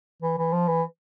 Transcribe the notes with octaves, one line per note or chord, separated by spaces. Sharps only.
E3
E3
F3
E3